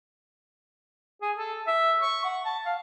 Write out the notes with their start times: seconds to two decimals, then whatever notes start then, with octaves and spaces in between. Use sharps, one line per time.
1.22 G#4
1.36 A4
1.67 E5
2.01 C#6
2.24 F#5
2.45 A5
2.66 F5